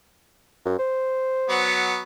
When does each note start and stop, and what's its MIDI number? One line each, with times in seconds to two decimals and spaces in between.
0.66 0.75 42
0.79 1.71 72
1.49 2.01 54
1.49 2.01 59